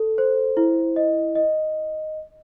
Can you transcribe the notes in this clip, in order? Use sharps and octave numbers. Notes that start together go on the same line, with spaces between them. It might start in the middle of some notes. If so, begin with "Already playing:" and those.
Already playing: A4
C5
E4
D#5
D#5